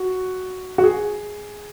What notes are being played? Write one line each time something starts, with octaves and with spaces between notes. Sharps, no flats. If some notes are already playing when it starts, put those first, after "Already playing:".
Already playing: F#4
F#4
G#4